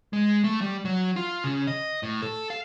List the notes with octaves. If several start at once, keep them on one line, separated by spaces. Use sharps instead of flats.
G#3
A3
G3
F#3
F4
C#3
D#5
A2
A4
F5